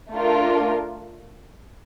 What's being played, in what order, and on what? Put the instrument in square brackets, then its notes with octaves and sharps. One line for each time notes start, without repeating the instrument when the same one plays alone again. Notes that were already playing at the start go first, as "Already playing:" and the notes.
[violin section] A3 D4 F4 A#4